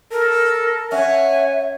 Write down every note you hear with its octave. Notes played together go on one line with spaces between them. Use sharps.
A4 A#4
C#4 E5 F#5 G#5